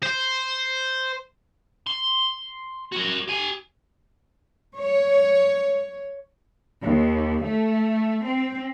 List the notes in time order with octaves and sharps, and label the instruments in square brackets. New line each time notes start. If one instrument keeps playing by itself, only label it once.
[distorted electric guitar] C5
C6
F#4 A#4
G4 G#5
[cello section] C#5
[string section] D#2
A3
C4